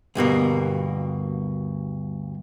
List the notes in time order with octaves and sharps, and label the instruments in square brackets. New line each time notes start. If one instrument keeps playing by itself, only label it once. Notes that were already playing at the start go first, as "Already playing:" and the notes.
[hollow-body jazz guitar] D2 G2 B2 A#3